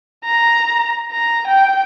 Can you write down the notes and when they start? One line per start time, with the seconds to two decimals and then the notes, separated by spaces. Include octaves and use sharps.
0.25 A#5
1.12 A#5
1.47 G5